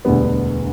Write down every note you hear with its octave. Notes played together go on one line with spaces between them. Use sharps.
E1 D2 D3 G3 B3